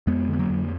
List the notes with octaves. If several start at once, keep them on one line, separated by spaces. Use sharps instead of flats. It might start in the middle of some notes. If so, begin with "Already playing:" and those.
F2 G#3 B3
D3 B3
F#3 A#3
F2